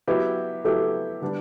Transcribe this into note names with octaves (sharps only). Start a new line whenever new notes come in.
F#3 B3 E4 G4 B4
F#3 B3 E4 G4 A4
D3 G3 B3 D4